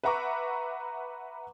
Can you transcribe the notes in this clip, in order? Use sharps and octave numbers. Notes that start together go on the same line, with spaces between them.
B4 E5 F#5 A#5 C#6 D6